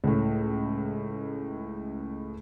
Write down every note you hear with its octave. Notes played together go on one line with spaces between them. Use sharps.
C#2 A2